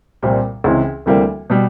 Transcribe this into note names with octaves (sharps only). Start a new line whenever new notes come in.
C2 A#2 G3 C4
C#2 C3 E3 G#3
D2 C3 E3 G3 A#3
B2 G3